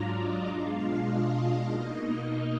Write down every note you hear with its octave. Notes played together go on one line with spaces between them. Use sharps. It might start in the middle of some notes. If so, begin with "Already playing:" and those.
Already playing: G#2 F#3 D4 F4 D5 A#5
D#5
B2 G#3 D4 F4 F5
D#5
B2 A#3 D#4